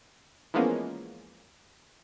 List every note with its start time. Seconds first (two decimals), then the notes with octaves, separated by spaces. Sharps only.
0.54 E3 F3 G#3 A#3 B3 C#4